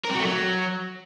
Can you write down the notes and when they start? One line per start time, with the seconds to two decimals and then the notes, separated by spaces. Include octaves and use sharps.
0.05 A#4
0.10 C4
0.15 F#4
0.20 A3
0.25 F#3